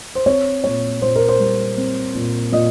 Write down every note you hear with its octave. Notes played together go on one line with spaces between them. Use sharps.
C5
C4 C#5
A#2 C#5
A#2 C5
A#4
C5
G3
C4
A#2
A#2 D#5